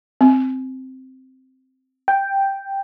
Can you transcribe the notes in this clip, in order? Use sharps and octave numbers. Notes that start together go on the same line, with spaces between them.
C4
G5